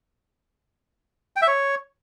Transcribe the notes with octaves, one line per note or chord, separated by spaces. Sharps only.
G5
E5
C#5